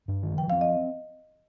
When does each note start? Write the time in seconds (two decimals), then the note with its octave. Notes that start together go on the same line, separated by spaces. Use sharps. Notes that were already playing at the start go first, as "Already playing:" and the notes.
0.08 G2
0.23 D#3
0.38 F3 G5
0.50 C4 F5
0.61 D#5